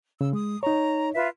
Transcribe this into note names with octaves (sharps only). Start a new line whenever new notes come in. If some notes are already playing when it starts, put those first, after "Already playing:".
C#3 E6
G#3 D#6
D#4 C#5 A#5
F4 B4 E5